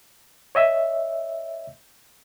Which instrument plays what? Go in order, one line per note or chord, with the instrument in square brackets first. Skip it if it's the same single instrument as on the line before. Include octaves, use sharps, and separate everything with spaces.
[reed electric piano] C#5 D#5 E5